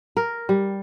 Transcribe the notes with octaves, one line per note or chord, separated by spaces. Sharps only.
A#4
G3